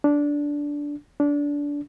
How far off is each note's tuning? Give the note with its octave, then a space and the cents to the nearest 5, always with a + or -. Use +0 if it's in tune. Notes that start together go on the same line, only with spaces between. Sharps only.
D4 -10
D4 -20